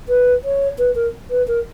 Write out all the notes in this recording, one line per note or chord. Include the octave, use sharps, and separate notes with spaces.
B4
C#5
B4
A#4
B4
A#4